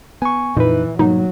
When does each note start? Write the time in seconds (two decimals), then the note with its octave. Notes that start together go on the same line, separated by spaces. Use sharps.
0.22 B3 G#5 C#6
0.57 F2 A#2 E3 D#4 B4
0.99 G#2 B2 F#3 G3 A#3 D#4